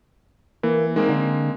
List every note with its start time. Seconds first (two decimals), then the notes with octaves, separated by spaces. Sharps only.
0.63 E3 A#3
0.96 D#3 G#3 A#3 C4
1.09 D3